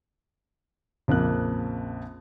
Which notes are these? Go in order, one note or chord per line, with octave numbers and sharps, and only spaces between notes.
A#1 F2 C#3 A#3 F#6